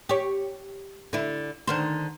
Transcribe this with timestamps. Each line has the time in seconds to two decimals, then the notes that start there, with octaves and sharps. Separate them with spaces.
0.09 G4 C#5
1.13 D3 E4
1.67 D3 D#3 C5